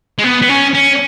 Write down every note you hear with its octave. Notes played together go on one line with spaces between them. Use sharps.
G#3
B3
B3
C#4
C#4